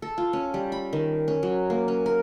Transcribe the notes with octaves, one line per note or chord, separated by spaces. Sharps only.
A4
F4
C#4
G3
B5
D#3
C#4
F#3
A#3
C#4
A#4